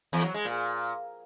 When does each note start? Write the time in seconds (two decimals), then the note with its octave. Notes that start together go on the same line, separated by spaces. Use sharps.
0.13 E2
0.24 F#3
0.34 G#3
0.45 A#2